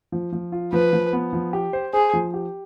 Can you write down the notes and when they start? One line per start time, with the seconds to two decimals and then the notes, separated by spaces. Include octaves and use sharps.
0.12 F3
0.32 F3
0.52 F4
0.73 F3 B4
0.93 F3
1.13 B3
1.33 F3
1.53 G4
1.73 C5
1.93 G#4 C5
2.13 F3
2.34 G4